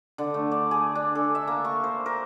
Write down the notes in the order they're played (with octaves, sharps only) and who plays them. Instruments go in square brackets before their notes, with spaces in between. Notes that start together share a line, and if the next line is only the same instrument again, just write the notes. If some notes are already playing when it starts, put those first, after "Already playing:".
[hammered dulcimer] D3
A3
D5
G#4
D4
A4
E5
A#3
C#6
C5
A#4